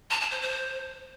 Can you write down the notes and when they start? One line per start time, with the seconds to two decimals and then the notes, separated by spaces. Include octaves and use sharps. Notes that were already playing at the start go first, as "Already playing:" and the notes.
0.11 A5
0.21 A5
0.31 C5
0.41 C5